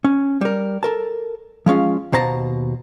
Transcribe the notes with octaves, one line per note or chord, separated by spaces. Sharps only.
C#4
G3 A#4
A4 A#4 A5
F3 G#3 C#4 F4
D#2 B2 C5 A5 A#5